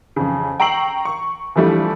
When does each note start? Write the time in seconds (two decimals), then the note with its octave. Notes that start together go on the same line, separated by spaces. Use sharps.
0.16 F2 C#3
0.60 G5 A#5 C#6 E6 C7 F#7
1.05 C#6
1.56 E3 F3 G3 A3 D4 E4